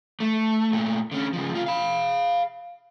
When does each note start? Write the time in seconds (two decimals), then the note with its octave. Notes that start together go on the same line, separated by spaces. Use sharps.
0.20 A3
0.73 A#2 A3
1.12 D3 C#4
1.33 C#3 F3
1.53 C3 F4
1.66 F5 B5